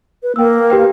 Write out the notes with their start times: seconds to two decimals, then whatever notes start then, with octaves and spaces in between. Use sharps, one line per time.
0.23 B4
0.36 A#3 G5 E6
0.70 G4 B4 G5